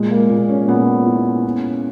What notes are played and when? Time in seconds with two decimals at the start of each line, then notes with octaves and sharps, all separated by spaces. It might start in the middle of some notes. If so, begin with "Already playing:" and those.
Already playing: A#2 G#3
0.11 A#3
0.30 A#2
0.49 C#4
0.68 A#2 B3
1.06 E4
1.44 C#4